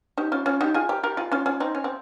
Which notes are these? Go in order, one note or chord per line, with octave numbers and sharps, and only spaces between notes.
D#4 G4
C#4 F4
C#4 F4
D#4 G4
F4 G#4
G4 A#4
G4 A#4
F4 G#4
C#4 F4
C#4 F4
C4 D#4
C#4
C4